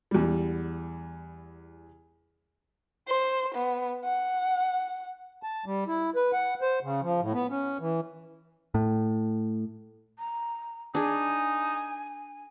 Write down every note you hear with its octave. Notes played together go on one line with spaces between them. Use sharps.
E2 G3
C5
B3
F#5
A5
G3
E4
B4
F#5
C5
C#3
F3
A2
B3
C#4
E3
A2
A#5
D4 D#4 G#4 G#5